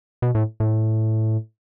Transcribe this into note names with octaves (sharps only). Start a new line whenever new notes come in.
B2
A2
A2